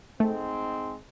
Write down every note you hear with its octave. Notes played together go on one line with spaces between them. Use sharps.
G#2 G#3 A3 C4